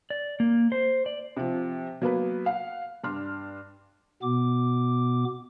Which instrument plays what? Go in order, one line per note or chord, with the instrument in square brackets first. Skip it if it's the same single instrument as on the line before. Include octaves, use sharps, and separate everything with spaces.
[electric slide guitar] D5
A#3
C5
D5
[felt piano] C3 F3
F#3 A#3 B3 B4
F5 F#5
G2 D4 C6 F6
[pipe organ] B2 B3 D6